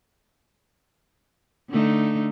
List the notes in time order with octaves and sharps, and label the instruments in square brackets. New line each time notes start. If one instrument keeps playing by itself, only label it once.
[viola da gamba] D3 A3 D#4